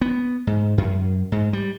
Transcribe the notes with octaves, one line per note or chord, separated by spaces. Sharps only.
B3
G#2
F#2
G#2
G3